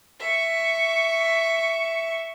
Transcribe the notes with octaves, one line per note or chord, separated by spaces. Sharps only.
E5 C#6